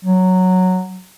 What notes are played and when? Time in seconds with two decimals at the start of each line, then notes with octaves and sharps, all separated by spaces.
0.05 F#3